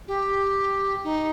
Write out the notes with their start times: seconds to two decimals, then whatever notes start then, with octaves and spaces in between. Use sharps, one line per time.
0.07 G4
1.04 D#4